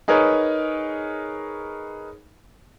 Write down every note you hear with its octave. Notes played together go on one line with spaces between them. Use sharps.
D#4 G#4 A#4 B4 C#5 D#5